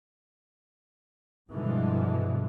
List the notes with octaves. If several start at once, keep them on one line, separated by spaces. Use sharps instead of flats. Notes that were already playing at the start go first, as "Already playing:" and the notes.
G2 B2 D3 E3 F3 G#3